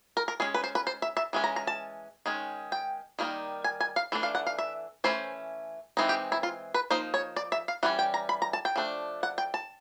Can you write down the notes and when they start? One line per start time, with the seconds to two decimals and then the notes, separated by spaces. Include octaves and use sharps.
0.17 A#4
0.28 A#4
0.40 G#3 C#4 G#4
0.54 B4
0.64 C5
0.75 B4
0.87 C5
1.02 E5
1.17 E5
1.33 E3 G#3 C#4
1.44 A#5
1.56 A#5
1.67 A5
2.26 D#3 G#3 C#4
2.72 G5
3.19 D#3 G3 A#3 D#4
3.64 G#5
3.80 G#5
3.96 F5
4.12 E3 A3 D4
4.23 F5
4.35 F#5
4.46 F5
4.58 E5
5.04 E3 A3 C#4 C5
5.97 E3 G#3 C4 D#4
6.09 G4
6.32 E4
6.43 F4
6.74 B4
6.90 F3 A#3 D#4 C5
7.14 C#5
7.36 D5
7.52 E5
7.68 F5
7.83 E3 G3 C#4 F#5
7.99 G5
8.14 A#5
8.29 B5
8.42 A#5
8.53 A5
8.65 G5
8.76 F3 A3 D4
9.23 F#5
9.38 G5
9.54 A5